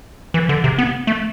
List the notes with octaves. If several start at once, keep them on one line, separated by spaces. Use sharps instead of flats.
E3
D3
C3
B3
A3